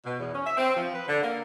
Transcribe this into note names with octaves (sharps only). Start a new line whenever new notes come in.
B2
E2
C#4
E5
C4
F3
B4
D3
A#3